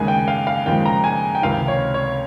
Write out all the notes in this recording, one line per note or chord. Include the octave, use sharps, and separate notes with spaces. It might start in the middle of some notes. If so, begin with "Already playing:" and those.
Already playing: D#2 C#3 G#3 G#5
G5
F5
F5
D#2 C#3 F3 G#3 G5
A#5
G#5
G5
C#2 C3 D#3 F5
C#5
C#5